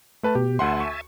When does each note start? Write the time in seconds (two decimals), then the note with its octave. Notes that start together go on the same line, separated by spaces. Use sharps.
0.23 A3 B4 A5
0.35 B2 G4
0.59 D2 E5 F#5 G#5 A5 C6
0.80 C#6